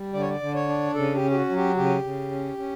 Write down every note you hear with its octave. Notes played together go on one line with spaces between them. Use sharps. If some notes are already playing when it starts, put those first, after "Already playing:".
Already playing: G3
D3 D5
C#5
D5
D3
C#5
D4
C#3 A4
G4
C#4
G4
F#4
F#3
G4
C#3 G4
C#3
C#4
C#4